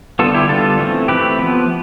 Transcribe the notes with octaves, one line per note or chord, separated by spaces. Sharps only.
D3 G3 B3 F4 A4
E4 G4
D3 G3 B3 F4 A4
E3 A3 C4
E3 A3 C4 G4 B4
F3 B3